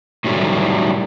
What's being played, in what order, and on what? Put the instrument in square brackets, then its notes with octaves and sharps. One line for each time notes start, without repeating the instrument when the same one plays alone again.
[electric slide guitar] A2 D#3 F#3 G3 A3